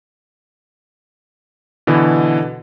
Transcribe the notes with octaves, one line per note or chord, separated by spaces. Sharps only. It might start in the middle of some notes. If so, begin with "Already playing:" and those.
B2 D3 E3